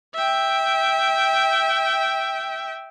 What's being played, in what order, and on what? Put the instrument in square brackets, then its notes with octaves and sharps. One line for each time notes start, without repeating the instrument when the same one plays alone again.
[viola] E5 G5